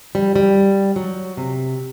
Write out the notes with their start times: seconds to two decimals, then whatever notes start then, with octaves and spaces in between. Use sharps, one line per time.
0.15 G3
0.36 G3
0.96 F#3
1.37 C3